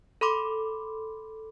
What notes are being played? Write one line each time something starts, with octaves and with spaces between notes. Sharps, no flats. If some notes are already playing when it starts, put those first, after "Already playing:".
A4 B5 C6 D6